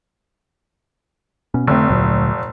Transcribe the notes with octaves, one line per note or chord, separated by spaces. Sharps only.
B2 B3 C#4
F1 D3 A3 C4
D2 A#2 F#3